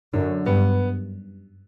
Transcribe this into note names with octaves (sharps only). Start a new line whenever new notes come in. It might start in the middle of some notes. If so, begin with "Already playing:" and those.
F#2 D3
G2 B3